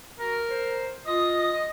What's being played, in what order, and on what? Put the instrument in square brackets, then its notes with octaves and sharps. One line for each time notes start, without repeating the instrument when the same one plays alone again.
[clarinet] F#4 [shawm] A#4
[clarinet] C5
[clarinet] F4 [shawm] D#5 [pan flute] D#6